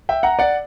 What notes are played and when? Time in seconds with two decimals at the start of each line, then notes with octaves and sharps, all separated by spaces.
0.09 E5 G5
0.23 F#5 A#5
0.39 D5 F#5